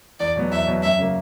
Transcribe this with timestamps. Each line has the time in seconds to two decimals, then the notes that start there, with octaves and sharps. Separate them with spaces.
0.20 E2 D5
0.36 B2 F#3 B3
0.51 E2 E5
0.67 B2 F#3 B3
0.83 F#2 E5
0.99 C#3 F#3 A#3